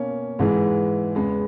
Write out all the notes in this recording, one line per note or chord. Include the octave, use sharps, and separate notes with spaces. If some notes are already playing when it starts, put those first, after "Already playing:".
Already playing: B2 A#3 C#4
G#2 E3 G#3
E2 C#3 G#3 B3